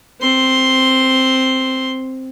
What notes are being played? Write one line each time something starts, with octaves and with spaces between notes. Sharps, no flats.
C4 C6